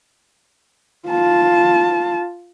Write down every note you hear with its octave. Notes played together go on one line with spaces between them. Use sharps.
F4 A5